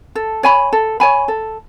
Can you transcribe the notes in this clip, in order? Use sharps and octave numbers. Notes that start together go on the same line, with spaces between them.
A4
C#5 G#5 B5
A4
C#5 G#5 B5
A4